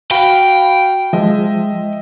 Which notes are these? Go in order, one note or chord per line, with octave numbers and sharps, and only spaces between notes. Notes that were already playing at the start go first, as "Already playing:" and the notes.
F#4 F5 G5 B5
F3 G#3 D#5 E5